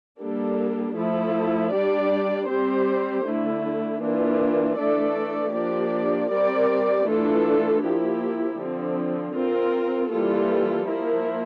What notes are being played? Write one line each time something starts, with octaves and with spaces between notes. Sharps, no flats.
G3 A#3 D4 A4
F3 A3 E4 A4
G3 D4 G4 D5
G3 C4 G4 C5
D3 A3 E4
E3 A#3 D4 F4
E3 A3 D4 A4 D5
F3 A#3 D4 G4 D5
G3 C4 G4 A#4 D5
E3 A3 D4 F4 A4
F3 A#3 E4 G4
D3 F3 C4
C4 F4 A#4
E3 G3 A#3 F4 A4
F3 A#3 E4 A#4